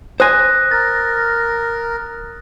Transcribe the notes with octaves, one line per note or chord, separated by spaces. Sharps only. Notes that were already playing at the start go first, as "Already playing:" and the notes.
C5 G#5 D#6 F#6 A#6
A#4 A6